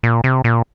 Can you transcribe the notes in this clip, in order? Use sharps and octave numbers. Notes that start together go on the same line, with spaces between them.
A#2
C3
A#2